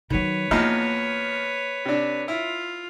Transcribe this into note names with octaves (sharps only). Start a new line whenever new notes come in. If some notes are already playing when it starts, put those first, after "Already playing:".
D#3 F#3 B4 C#5
E2 F3 A#3 D#4
C3 D4
E4 F4